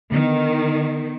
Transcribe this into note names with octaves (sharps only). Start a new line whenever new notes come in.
D3 D#3 B3